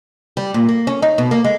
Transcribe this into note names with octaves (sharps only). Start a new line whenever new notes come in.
G3
A#2
A#3
C#4
D#4
B2
A#3
G#3